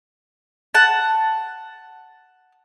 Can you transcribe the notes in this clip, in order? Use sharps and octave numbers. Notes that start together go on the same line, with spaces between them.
F#5 A5